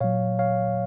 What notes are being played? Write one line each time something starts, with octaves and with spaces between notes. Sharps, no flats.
A#2 F#3 C#5 F5
C#5 F5